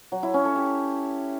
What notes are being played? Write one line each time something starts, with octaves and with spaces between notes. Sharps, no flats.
F#3
E4
C#4
A4
G4